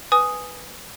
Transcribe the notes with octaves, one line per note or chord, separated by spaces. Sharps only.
B4 G#5 D#6